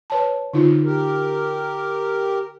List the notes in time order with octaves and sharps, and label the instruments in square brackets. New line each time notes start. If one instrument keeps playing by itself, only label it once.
[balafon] B4 C#5 A5
D3 D#4 F4
[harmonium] G4 A#4